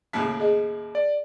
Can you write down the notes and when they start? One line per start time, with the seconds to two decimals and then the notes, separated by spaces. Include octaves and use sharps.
0.13 D#2 A2 C#3 B6
0.40 G#4 D#5
0.95 D5